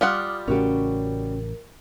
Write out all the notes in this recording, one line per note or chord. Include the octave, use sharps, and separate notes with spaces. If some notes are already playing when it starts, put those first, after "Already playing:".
G3 F4 F#5 D6 D#6 F6
A1 A2 C#3 C#4 F#4 G4 A#4